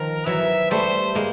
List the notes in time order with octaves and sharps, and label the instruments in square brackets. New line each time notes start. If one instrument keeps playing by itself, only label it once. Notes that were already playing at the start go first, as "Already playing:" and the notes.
Already playing: [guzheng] D#3 F3 [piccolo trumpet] A#4
[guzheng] E3 F#3 [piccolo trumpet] E5
[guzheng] G3 A3 [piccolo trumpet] C5
[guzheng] G#3 A#3